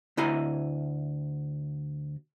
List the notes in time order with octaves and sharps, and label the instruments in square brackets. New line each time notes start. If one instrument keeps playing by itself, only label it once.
[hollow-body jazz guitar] D2 E4 G#5 A#5